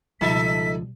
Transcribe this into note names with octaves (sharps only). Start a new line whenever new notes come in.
C#2 B2 F3 G3 D#4 A4 E5 B6